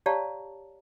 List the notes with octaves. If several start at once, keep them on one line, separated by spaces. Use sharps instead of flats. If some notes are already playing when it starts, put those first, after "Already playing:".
G4 C#5 D5 F5 A5 A#5